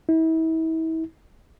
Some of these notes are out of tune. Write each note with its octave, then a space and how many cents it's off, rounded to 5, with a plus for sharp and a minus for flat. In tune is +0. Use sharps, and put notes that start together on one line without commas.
E4 -35